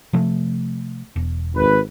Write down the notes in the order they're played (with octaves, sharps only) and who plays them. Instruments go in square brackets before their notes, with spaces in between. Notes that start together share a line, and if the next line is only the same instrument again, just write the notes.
[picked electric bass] C3 F3 A3
E1
[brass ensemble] G#1 B4